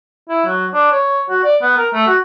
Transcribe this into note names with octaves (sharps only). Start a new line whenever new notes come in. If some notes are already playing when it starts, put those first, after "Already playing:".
E4
F#3
D4
C#5
F#4
D5
B3
A#4
A3
F#4